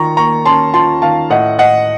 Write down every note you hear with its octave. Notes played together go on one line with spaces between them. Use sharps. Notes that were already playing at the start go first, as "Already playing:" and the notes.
Already playing: D#3 F4 A#5 C#6
A#3 A#5 C#6
C#4 A5 C6
F4 A5 C6
D#3 F5 A5
A2 D#5 F#5
A2 D#5 F#5